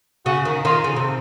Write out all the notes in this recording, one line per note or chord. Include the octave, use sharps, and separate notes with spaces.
C#3 F#4
D#3
D#3 F4
C#3
C3